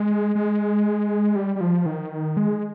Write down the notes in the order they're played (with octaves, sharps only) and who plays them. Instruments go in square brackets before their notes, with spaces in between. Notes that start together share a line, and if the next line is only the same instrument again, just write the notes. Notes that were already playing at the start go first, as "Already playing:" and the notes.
Already playing: [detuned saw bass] G#3
G#3
G3
G3
F3
D#3
G#3